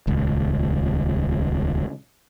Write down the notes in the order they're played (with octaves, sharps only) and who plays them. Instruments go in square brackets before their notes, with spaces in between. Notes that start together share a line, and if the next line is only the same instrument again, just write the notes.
[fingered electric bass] D#1 C#2